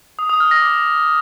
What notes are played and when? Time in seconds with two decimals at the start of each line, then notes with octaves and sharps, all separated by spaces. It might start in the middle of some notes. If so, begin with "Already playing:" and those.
0.19 D#6
0.29 D#6
0.40 F6
0.51 A#6
0.62 D6